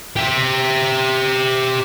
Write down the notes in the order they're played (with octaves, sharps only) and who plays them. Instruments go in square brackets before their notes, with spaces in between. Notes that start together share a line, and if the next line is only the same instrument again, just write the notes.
[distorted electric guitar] G4 E5